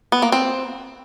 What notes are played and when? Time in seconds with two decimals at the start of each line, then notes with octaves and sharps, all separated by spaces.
0.12 B3
0.22 A#3
0.32 C4